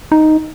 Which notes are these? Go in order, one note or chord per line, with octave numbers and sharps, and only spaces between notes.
D#4